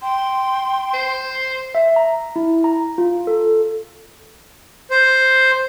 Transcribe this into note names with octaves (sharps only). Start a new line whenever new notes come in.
G5 C6
C5
E5
A#5
E4
A#5
F4
A4
C5